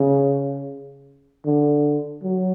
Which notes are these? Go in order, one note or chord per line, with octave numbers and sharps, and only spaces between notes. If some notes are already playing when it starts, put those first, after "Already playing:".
Already playing: C#3
D3
F#3